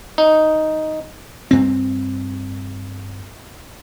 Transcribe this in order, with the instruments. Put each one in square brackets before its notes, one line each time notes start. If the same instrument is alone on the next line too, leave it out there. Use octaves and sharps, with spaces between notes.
[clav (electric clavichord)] D#4
[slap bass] G2 C4